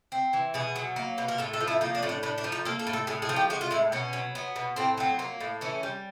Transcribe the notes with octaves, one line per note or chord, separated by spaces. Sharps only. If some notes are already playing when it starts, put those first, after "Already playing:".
C4
E3
B2 G#4
F#3
A#3
B2
A#4
A2 A4
A4
F3
E4
A#3 D#4
D4
A2 C#4
D4
A2 D4
D4
F3
D#4
A#3 A4
A4
A2
A4
A2 G#4
G#4
F3
G4
G#3 F#4
F4
A2 E4
B2 C#4
F#3
B3
B2
A2 C4
F#3 C4
A#3
A2
E3 C#4
G3